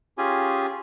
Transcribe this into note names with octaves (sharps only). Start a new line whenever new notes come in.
C#4 F4 G4 G#4 G#5